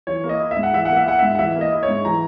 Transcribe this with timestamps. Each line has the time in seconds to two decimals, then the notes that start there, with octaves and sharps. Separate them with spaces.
0.07 E3 C#5
0.24 A#3
0.29 D#5
0.40 E4
0.51 E5
0.57 G#2
0.63 F#5
0.73 E3 E5
0.85 A#3 F#5
0.97 E5
1.06 E4 F#5
1.19 G#2 E5
1.35 F#5
1.39 E3 E5
1.56 A#3
1.61 D#5
1.72 E4
1.83 C#5
1.88 G#2
2.05 E3 A#5